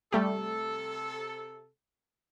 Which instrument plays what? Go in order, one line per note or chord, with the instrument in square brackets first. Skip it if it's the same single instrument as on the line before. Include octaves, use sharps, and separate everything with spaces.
[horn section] C3 A4 [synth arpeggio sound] G3 A3 G4